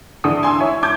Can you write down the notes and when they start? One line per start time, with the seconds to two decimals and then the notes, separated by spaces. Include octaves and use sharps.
0.24 D3 E3 D#6
0.43 G#5 C6 D#6 E6
0.60 E4 C#5
0.83 A5 D6 G6 G#6